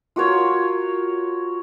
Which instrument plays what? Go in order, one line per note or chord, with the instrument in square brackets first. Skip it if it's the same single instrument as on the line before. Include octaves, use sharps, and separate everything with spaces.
[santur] F4 F#4 A#4 C#5